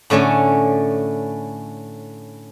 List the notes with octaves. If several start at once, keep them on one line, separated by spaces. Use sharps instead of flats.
A2 D3 A3 C#4 G#5